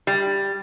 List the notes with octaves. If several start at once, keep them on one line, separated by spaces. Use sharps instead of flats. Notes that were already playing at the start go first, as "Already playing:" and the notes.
G3